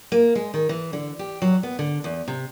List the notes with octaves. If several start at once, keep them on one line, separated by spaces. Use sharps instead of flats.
A#3
G#3
D#3
E3
D3
G4
F#3
B3
D3
E2
C3